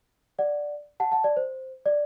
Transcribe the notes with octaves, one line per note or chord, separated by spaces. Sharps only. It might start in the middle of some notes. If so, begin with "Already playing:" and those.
D5 F#5
F#5 A5
F#5 A5
D5
C5
D5